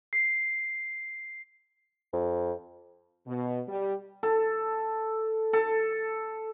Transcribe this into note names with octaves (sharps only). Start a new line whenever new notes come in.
C7
F2
B2
G3
A4
A4